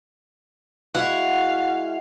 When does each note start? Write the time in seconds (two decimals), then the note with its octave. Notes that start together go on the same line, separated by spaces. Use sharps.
0.95 G#3 E4 F#4 F5 F#5